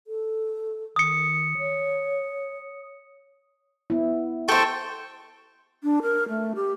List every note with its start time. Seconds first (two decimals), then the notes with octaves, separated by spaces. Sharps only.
0.07 A4
0.96 D#3 D#6 C#7
1.58 C#5
3.90 B3 E4
4.48 A4 C5 G5 C#6
5.83 D4
6.02 A#4
6.29 A3
6.55 G4